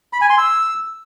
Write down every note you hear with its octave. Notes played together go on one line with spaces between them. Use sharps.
B5
G#5
C6
E6